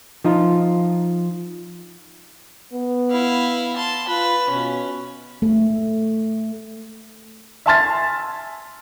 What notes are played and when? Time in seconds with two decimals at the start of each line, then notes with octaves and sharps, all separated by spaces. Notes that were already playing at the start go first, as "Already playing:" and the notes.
0.24 F3 D#4 F4
2.73 B3
3.11 E4 F5
3.76 A5 C6
4.08 F4 B4
4.50 B2 C#4
5.42 A3
7.66 E5 G#5 A5 C6 F6 A6